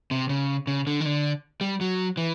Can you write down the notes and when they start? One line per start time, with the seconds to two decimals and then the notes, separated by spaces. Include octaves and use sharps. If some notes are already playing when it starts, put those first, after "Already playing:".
0.11 C3
0.29 C#3
0.67 C#3
0.87 D3
1.01 D#3
1.06 D3
1.61 G3
1.81 F#3
2.17 E3